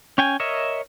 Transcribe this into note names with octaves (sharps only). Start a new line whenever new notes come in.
C#4 G5 G#5
A#4 C#5 D#5 E5